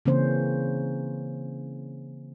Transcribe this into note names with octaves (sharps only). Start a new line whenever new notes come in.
C#3 E3 A#3 C4 C#4 C5